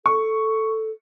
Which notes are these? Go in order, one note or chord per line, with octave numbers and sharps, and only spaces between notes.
A4 C#6